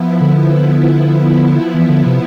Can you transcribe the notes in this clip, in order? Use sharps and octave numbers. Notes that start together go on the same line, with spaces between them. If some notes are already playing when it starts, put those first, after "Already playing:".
Already playing: F3 B3 E4
D3
E3
D3
C3